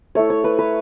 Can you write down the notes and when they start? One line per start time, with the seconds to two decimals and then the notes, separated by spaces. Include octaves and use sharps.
0.15 A3 E4 C#5
0.30 C#5
0.44 B4
0.59 B4